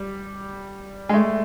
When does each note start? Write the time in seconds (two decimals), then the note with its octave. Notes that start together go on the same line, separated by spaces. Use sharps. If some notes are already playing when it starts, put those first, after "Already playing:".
Already playing: G3
1.09 G#3
1.13 A3